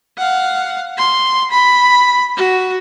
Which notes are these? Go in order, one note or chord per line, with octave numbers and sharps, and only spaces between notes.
F5 F#5
C6
B5
F#4